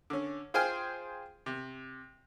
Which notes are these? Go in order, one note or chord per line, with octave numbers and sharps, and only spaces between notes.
D3 C#4
F4 G#4 C5 G5 G#5 F6
C3